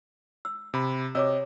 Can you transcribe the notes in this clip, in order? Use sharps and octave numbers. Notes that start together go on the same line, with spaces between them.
E6
C3 B5
C3 F#4 C#5 D#5 D6 E6